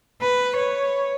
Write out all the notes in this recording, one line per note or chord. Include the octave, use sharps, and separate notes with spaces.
B4
C#5